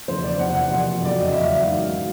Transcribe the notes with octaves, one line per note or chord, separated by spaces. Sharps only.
E2 C#3 F3 C5
D5
E2 C3 E3 F#5
F#5
A#2 F3
F2 C#3 F#3 D5
D#5
E2 C#3 F#3 E5
F5
G#2 D#3 F#3 F5
D#3 F#3